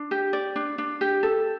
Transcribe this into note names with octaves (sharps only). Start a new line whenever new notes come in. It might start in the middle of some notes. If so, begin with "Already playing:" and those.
Already playing: D4
G4
D5
D4
D4
G4
A4